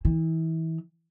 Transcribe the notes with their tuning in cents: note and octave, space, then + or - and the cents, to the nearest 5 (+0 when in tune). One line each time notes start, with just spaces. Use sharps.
E3 -30